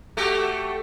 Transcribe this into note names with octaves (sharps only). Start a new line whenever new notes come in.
A3 F#4 G4